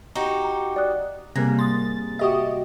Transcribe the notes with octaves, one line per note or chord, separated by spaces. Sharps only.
D#4 F#4 G4
A#5
D5 D#6 F#6
G#2 C3 G3 A#3 F#6 G#6 A#6
C6 D#6 A6
F#4 G4 D#5 E5 C#6 D#6